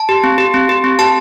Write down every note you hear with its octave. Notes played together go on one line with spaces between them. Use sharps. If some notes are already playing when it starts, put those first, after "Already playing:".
Already playing: A5
G4
C4
G4
C4
G4
C4
G4 A5